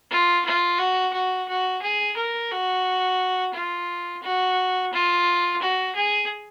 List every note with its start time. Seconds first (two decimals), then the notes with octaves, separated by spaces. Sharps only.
0.11 F4
0.45 F4
0.79 F#4
1.13 F#4
1.48 F#4
1.82 G#4
2.17 A#4
2.51 F#4
3.54 F4
4.23 F#4
4.93 F4
5.62 F#4
5.95 G#4